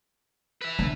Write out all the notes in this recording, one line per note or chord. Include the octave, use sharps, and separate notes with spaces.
B4 E5
D2